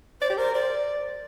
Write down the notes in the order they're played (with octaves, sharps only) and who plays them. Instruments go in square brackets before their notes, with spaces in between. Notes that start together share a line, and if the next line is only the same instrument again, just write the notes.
[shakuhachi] C5 [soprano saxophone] D5
[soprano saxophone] G4
[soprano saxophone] A#4 [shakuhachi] C5
[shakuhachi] C5 [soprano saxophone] D5